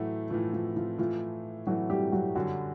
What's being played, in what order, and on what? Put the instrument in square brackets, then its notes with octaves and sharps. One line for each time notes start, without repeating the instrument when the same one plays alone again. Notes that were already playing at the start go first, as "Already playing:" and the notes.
Already playing: [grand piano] A2 E3 A3 [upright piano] F#3 F#4
[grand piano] A2 E3 A3 [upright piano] F3 F4
[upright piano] F3 F4
F3 F4
[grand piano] A2 E3 A3 [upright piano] F3 F4
[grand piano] A2 E3 A3 [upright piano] F#3 F#4
[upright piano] G3 G4
F#3 F#4
[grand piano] F#2 D3 G3 [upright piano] F#3 F#4